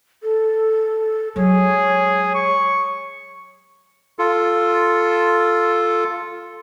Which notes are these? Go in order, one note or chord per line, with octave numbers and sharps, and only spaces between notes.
A4
F#3 G#3 G#4 C#5
C#6
F4 A4